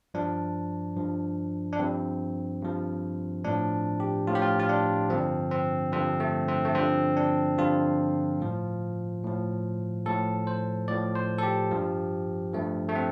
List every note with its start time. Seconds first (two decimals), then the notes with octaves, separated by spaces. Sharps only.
0.14 G2 F3 D4
0.97 G2 F3
1.73 D4
1.79 G2 F3 C4
2.62 G2 F3
3.45 A2 F3 D4
4.00 G4
4.27 A2 F3 F4
4.35 G4
4.42 F4
4.59 F4
4.69 D4
5.10 G2 D3 F3 C4
5.51 C4
5.92 G2 D3 F3 C4
6.20 A3
6.48 C4
6.65 A3
6.75 G2 D3 F3 C4
7.16 D4
7.58 G2 D3 F3 F4
8.40 A2 F3
9.24 A2 F3
10.06 A2 F3 A4
10.47 C5
10.88 A2 F3 D5
11.16 C5
11.38 A4
11.43 G4
11.71 G2 F3
12.53 G2 F3 A3
12.89 A3
12.95 C4